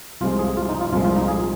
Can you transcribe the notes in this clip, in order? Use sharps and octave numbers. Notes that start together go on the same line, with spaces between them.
C2 C3 F3 G#3 F4
G#4
F4
D#4
F4
C2 A#2 F3 G#3 F4
F4
D#4
G#4